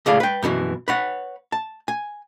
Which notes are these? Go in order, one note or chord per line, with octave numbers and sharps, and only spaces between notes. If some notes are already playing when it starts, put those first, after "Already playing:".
C#2 A2 G#4 D5 F5
B4 G5
F#2 B2 D3 E3
B4 C#5 F#5
A5
G#5